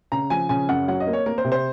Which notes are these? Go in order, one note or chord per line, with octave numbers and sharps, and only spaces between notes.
C#3 A#5
F3 G#5
C#3 G#5
F#2 F#5
F#3 F#5
D#5
A#3
C#5
A#3 A#4
C5
C3
C5